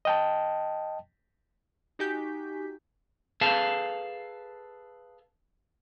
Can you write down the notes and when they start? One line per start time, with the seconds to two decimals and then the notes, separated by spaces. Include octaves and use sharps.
0.05 D#5 G5 A5
1.99 D#4 F#4 G4 G#5 G6 B6
3.41 G#4 A4 B4 F5 A5